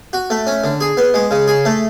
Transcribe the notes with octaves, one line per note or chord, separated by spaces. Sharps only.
F#4
A3
C#4
D3
G#4
B3
G#3
C#3
G#4
A3